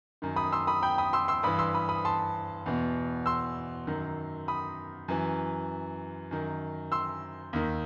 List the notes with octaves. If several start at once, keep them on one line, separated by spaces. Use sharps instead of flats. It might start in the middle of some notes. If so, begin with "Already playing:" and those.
F#2 D#3
B5 D#6
C6 E6
B5 D#6
G5 B5
B5 D#6
C6 E6
C6 E6
G2 E3 B5 D#6
C6 E6
B5 D#6
B5 D#6
A5 C6
E2 B2
C6 E6
F#2 D#3
B5 D#6
F#2 E3
F#2 D#3
C6 E6
D#2 D#3